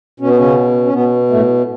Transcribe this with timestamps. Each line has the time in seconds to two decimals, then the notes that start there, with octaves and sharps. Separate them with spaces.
0.20 B2 C#4
0.29 B3
0.37 C#3 C#4
0.85 C#4
0.93 B2 B3
1.30 A2 A3